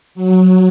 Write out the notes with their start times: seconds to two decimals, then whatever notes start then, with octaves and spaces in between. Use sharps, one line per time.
0.15 F#3